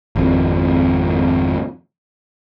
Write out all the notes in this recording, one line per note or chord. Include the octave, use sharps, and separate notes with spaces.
G#1 F2